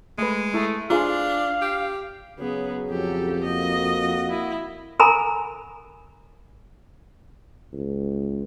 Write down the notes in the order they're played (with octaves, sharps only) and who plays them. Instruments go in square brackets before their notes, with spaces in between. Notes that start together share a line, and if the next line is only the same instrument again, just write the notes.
[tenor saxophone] G#3 [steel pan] A3 B4
[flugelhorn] A3 [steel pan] E4
[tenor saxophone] D4 [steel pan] F4 G#4 [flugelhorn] F5
[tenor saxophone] G4
[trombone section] C#3 F#3 [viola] B3 G#4
[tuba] F2 [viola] G4 A4
[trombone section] A#3 F#4 [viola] D#5
[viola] E4
[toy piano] A4 A#4 G#5 A#5 B5
[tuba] C#2